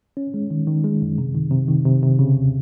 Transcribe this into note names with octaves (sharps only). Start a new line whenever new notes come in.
C#4
G#3
D#3
D#3
G#3
F#2
C3
D#3
C3
D#3
C3
C3
C#3
D#2